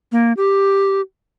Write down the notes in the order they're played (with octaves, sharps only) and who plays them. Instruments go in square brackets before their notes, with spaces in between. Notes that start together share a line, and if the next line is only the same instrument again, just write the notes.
[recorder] A#3
G4